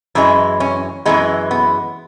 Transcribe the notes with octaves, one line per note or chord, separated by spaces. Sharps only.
F#2 E3 G#3 E4
C#4
F#2 E3 G#3 B3
B3